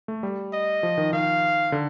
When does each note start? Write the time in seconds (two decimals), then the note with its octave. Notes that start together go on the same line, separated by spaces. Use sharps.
0.08 A3
0.23 G3
0.53 D#5
0.83 F3
0.98 D#3
1.13 D#3 F5
1.72 D3